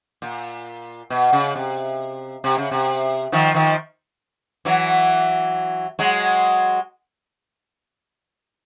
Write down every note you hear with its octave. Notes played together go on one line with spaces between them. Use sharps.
A#2
B2
C#3
C3
C3
C#3
C3
D#3 F3
D#3 F3
E3 F#3
F#3 G#3